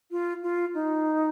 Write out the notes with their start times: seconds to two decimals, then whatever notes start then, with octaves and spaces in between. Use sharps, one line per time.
0.11 F4
0.43 F4
0.74 D#4